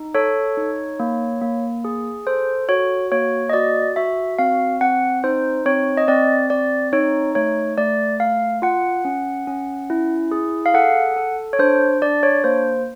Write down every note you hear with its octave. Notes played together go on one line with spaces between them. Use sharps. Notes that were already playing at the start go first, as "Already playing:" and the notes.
Already playing: D#4
A4 C#5
D#4
A#3
A#3
G#4
A4 C5
F#4 C#5
A#3 C#5
D#5
F#4 D5
F#4 E5
C4 F5
C4 F#5
D#4 C5
C4 C#5
D#5
C4 D5
C4 D5
D#4 C#5
A3 C#5
A3 D5
A3 F5
F4 F#5
C#4
C#4
E4
G#4
F5
A4 F#5
A4
C#5
D4 C5
D4 D5
C#5
A#3 C5